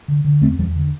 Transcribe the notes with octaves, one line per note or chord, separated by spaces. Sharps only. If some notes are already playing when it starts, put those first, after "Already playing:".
D3
D3
E2 A3 C4
E2 E3 G3
D3